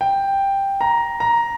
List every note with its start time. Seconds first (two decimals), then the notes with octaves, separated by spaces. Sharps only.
0.01 G5
0.81 A#5
1.20 A#5